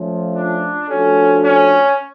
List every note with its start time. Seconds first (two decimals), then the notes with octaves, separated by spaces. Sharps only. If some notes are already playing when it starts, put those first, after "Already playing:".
Already playing: F3 A3 C#4 F4
0.36 D4
0.89 F3 A3 C#4 D4 F#4 A4
1.44 C#4